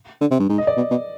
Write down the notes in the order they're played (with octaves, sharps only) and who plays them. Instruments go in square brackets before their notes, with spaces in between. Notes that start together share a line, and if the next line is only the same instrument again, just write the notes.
[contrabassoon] D3
C3
G2
G#2
[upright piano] D#5
D5
[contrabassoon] B2
B2